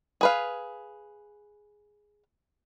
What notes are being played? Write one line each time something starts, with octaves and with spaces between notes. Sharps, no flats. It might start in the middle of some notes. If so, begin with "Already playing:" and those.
G#4 B4 F5